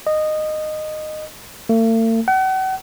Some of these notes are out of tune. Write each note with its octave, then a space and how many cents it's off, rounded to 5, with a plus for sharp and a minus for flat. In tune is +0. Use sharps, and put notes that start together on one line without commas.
D#5 -15
A3 +45
F#5 +40